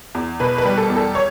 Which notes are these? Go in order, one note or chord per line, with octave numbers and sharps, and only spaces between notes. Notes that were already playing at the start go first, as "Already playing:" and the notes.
E2
B2 B4
B4
G3
A4
E2
A4
C#5